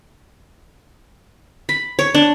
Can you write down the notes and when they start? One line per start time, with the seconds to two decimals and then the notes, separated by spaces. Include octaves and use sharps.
1.69 B5
1.99 C#5
2.15 D4